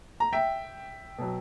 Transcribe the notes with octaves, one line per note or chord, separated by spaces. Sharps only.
A#5
E5 G5
B2 F#3